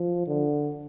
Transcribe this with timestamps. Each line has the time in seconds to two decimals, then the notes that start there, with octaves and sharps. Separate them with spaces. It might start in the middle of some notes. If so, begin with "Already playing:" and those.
Already playing: F3
0.27 D3